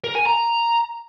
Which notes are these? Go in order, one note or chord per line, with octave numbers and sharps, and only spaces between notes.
A#4
G#5
A#5